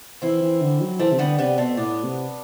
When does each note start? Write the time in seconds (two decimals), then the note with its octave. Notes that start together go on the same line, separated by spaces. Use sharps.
0.22 E3 C4 E4
0.42 E3
0.61 D3
0.81 F#3
0.99 E3 A3 C4
1.12 C3
1.19 D3 G3 B3
1.39 C3 G3 B3
1.58 B2 A3 C4
1.77 A2 B3 D4
2.03 C3